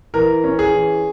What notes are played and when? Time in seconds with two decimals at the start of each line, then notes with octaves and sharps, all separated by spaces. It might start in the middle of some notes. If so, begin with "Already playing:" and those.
0.14 E3 A#4
0.44 C#4
0.59 G#4
0.74 E3